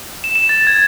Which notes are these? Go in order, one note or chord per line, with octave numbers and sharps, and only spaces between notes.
E7
E7
A6
G#6